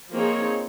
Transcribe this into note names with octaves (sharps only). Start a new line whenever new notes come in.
F3 A#3 C4 D#4 G#4 C#5